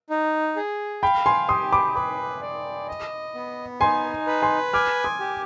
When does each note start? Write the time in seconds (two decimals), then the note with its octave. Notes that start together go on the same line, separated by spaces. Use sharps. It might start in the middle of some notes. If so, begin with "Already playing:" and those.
0.10 D#4
0.56 G#4
1.02 F5 G5 B5
1.26 G#5 C6
1.49 G4 C6 D#6
1.72 B5 D6
1.95 B4 B5 D6
2.41 D5
2.88 D#5
3.35 B3
3.81 D#4 G#5 C6
4.27 B4
4.42 G#5 C6
4.73 G#5 D6 F6
5.04 C6 D#6
5.20 G4